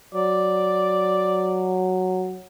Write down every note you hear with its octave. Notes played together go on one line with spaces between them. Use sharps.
F#3 D5